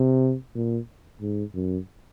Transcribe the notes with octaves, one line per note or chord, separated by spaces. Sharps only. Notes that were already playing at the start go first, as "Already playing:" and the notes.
Already playing: C3
A#2
G#2
F#2